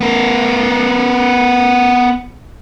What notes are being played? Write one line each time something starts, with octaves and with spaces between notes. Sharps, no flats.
B3 A#4